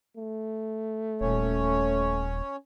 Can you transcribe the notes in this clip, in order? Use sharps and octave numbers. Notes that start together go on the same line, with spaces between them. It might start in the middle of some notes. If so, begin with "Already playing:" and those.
A3
D#1 C#4 C#5